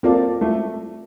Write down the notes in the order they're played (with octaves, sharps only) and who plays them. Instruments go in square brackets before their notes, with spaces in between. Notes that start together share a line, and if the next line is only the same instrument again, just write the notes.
[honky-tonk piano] A#3 [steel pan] C4 F4 A4 D5
[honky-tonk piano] A3